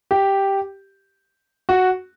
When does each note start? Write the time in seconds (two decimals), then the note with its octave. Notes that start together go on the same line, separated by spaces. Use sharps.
0.11 G4
1.69 F#4